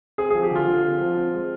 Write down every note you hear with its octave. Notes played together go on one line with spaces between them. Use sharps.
C4 G#4
F3 G#4
G4
D3 F4
D3
C4
F3
C4
G#3